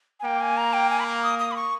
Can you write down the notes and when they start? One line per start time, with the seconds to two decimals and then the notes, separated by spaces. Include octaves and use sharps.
0.20 G#5
0.24 A#3 G5
0.41 G#5
0.57 A#5
0.73 G5
0.90 G#5
1.00 B5
1.06 A#5
1.23 D#6
1.39 D#6
1.51 B5
1.56 C#6